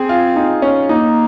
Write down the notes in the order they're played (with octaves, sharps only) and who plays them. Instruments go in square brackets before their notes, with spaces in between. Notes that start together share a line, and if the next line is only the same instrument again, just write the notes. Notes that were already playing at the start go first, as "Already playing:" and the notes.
Already playing: [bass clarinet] C4 [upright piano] G#4
[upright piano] F4
D#4
C#4
[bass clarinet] A#3 [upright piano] D#4